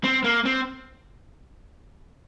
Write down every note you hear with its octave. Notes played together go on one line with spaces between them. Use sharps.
C4
A#3
C4